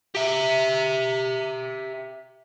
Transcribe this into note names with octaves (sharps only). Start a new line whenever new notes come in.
G4 E5